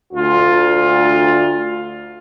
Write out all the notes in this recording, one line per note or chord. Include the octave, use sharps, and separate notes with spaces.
D2 F4